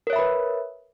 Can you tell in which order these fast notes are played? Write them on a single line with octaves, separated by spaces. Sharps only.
A#4 C#5 E5 B5 B4